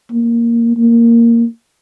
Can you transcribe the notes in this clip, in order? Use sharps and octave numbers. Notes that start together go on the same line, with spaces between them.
A#3
A#3